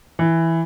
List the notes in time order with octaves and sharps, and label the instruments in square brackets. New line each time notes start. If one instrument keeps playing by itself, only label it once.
[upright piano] E3